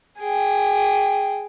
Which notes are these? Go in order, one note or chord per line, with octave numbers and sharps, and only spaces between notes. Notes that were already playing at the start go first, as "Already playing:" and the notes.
G#4 G5